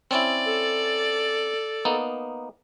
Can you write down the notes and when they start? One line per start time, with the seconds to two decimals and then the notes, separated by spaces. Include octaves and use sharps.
0.11 C4 C#4 E4 D5
0.46 A4
1.85 A#3 B3 D#4